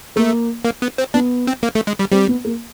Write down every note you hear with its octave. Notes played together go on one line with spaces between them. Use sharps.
A3 A#3
A#3
B3
C4
B3 D4
C4
A#3
A3
G#3
G3
G3 C4
B3
A#3